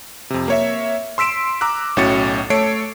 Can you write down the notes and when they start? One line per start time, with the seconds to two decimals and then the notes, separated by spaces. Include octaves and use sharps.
0.30 F2 C3
0.48 A#3 C#5 E5
1.18 C6 E6 B6 D7 E7
1.61 A#5 D6 E6 F#6
1.97 B1 A2 C#4 F#4 A6 C#7
2.50 A3 A4 C#5 C7 D7